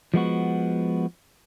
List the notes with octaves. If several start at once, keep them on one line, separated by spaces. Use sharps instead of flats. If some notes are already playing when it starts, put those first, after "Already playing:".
F3 G#3 B3 F#4